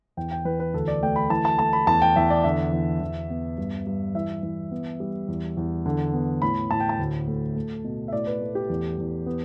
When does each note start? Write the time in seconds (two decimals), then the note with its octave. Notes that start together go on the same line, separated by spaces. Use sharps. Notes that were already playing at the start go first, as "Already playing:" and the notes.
0.17 E2 G5
0.31 G5
0.45 E3 B4
0.60 B4
0.74 D2 A4
0.88 D5
1.03 A3 G5
1.16 B5
1.30 E3 A5
1.45 A5
1.59 A3 A5
1.73 B5
1.87 E2 A5
2.02 G5
2.16 E2 E5
2.30 D5
2.44 D3 E5
2.72 E2
3.01 E2
3.30 B3
3.58 G2
3.87 G2
4.15 E3 E5
4.43 E3
4.71 B3
5.00 G3
5.28 E2
5.57 E2
5.86 D3
6.13 B3
6.42 A2 B5
6.71 A2 A5
6.80 G5
6.89 A5
6.99 D2
7.28 A3
7.56 A3
7.84 B2
8.08 E5
8.13 A2 D5
8.27 B4
8.41 A3
8.55 G4
8.69 E2
8.98 E2
9.26 B3